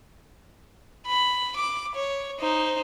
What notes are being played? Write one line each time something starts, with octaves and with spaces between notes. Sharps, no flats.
B5
D6
C#5
D#4 C5